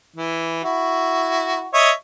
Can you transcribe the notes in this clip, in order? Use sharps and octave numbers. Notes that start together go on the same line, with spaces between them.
E3
E4 F#4
C#5 D#5 E5